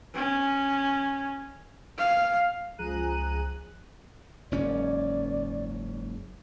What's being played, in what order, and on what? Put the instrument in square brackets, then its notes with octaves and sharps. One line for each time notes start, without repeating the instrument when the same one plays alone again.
[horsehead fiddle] C#4
F5
[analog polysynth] C#2 F3 G#4 A#5 F#6 D#7
[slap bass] F#1 G#2 C#4 [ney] D5